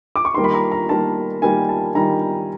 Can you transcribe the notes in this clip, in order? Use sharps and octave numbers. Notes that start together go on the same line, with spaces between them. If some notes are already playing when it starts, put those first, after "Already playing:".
D6
C#6
D#3 G3 A#3 C6
B5
A#5
A#5
D#3 G3 A#3 A5
D#3 G3 A#3 G#5
A5
D#3 G3 A#5